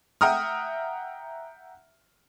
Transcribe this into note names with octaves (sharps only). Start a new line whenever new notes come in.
E5 F#5 G5 A#5 D#6 F6